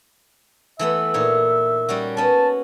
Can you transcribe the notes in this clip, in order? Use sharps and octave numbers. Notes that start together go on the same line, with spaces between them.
E3 A3 B3 E5
A#2 D#4 C#5
G3 C#4 F#4
B3 C#4 A5